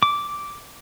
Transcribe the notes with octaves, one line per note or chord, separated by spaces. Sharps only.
D6